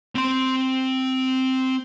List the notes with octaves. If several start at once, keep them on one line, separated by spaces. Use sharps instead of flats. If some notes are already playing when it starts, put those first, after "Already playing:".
C4 C6